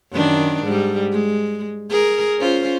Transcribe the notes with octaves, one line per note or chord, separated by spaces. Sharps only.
F#2 D#3 D4
G#2 G3
G#3
G#4 A#4
C#4 F4 C5